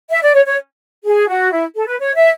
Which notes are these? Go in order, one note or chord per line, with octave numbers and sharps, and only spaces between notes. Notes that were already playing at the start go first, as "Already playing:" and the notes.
E5
D5
C#5
C#5
G#4
F#4
E4
A4
B4
C#5
E5